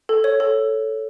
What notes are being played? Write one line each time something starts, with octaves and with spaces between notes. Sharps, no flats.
A4
C#5
A4